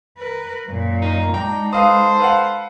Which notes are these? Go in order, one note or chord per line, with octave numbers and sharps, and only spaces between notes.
A#4 B4
F#2 A#2
D#4 A#4
G#3 D4 D#4 G5 A#5
A4 B4 C5 F5 D#6
B4 F5 F#5